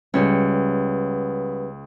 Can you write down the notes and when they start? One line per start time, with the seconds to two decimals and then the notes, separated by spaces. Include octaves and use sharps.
0.14 C#2 G3 B3 C#4